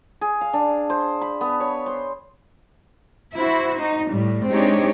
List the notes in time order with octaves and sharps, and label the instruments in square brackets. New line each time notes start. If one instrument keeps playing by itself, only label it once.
[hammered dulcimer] G#4
F5
D4
C5
B5
B3
C#5
C5
[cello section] E4 F#4 C5
D#4
A2 G3
G#3 C4 D4 D#4 G4 C#5